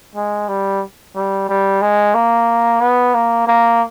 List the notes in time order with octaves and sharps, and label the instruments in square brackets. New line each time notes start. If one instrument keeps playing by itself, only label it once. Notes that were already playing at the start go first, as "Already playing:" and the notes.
[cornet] G#3
G3
G3
G3
G#3
A#3
B3
A#3
A#3